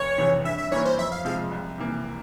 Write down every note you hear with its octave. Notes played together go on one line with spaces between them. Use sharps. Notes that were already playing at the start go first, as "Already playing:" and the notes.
Already playing: F1 C#5
E2 C3 E3
G2 E5
E5
E3 G3 A#3 C#4 C#5
C5
F2 E5
F5
C3 F3 G#3 C4 F5
C2
C3 E3 A#3